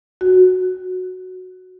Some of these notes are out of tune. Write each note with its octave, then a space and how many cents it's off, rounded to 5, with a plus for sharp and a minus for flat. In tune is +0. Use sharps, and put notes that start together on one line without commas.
F#4 -5